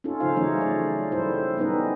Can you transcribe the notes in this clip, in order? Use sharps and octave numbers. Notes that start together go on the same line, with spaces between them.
C#4 D#4 F4 A4
C#3 F3 D#4 C5 F5
E3 F#3 A3 C#4 D#4 C#5
D5
G3 E4 A4 C5
G3 B3 C#4 D#4 B4 D#5